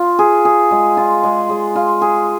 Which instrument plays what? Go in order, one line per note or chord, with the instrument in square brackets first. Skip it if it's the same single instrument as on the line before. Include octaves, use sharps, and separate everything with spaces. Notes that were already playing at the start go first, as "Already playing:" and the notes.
Already playing: [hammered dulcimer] F4
G#4
G#4
G#3
F4
G#3
G#3
F4
G#4